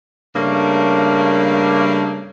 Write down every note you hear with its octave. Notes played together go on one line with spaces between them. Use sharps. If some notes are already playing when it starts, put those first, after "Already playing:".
G2 C#3 A3 A#3